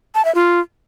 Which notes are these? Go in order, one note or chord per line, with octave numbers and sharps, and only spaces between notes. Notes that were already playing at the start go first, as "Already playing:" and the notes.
A5
E5
F4